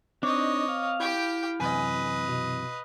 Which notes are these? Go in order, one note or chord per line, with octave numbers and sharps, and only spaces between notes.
C4 D4 D#4 C#5 D#5 D6
F5
E4 G4 G5
F#2 C3 E3 B4 D#5 G#5
B2